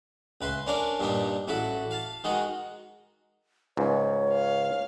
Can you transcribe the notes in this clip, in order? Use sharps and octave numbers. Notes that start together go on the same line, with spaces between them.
C#2 B4 E5 C6
C#4 D4 A#4 D5 F5
G2 A#2 G3 D4 D#4
A1 E4 F#4 A4 E5
F5 A5
D#3 G#3 D#4 F#4
C#2 G#2 C#5
F5